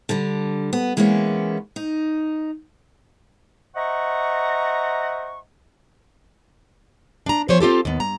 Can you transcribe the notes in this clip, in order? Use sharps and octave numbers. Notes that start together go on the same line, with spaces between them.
D3 G3
B3
E3 G#3 A#3 B3 C#4
D#4
C5 D#5 E5 F#5 A#5 C#6
D4 A#5
E3 F3 B3 C5 C#5
C4 F4 G4 A4
D#2 B3
G2 A#5